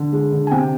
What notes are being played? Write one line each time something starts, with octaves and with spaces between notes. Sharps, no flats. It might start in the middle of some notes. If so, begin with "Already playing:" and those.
Already playing: D3
G#3
D3
G#5
C3 G5